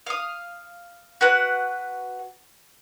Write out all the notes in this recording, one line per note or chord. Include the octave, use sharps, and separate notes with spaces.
F5 D#6
F#4 B4 F#5